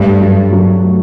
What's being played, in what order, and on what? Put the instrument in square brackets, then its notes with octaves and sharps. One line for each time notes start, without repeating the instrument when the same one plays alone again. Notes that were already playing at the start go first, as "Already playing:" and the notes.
Already playing: [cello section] G2 [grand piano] A3
[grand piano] F#3
F#3
A3